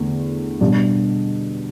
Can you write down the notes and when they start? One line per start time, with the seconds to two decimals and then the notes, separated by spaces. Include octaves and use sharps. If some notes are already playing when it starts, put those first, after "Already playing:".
Already playing: E2 D3 A3
0.61 B2 G3 D4